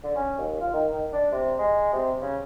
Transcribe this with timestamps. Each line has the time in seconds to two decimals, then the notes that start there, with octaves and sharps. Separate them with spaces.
0.03 D3
0.15 C#4
0.38 D#2
0.60 F4
0.73 D#3
0.92 D#3
1.13 D4
1.32 C3
1.58 G#3
1.93 C3
2.21 C#3